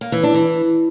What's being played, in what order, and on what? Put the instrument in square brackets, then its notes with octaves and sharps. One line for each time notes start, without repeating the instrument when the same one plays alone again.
[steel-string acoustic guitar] A#3
E3
D4
E3